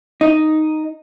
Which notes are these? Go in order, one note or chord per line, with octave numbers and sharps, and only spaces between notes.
D#4